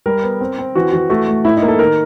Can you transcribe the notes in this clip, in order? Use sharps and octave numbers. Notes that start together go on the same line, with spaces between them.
G3 A#4
B3
C4
C4
E3 F#4
E3 F#4
A3 F#4
A3
A2 E4
D#4
A#3
A4
D#3 A#4